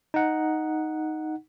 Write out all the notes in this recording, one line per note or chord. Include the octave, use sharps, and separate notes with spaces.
D#4 F#5